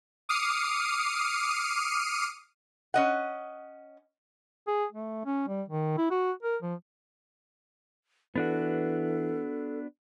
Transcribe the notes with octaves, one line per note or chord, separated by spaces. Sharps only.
D6 D#6 F6 C7 C#7 D#7
C#4 D#5 F#5
G#4
A3
C#4
G3
D#3
E4
F#4
A#4
F3
E3 B3 D4 F#4 A4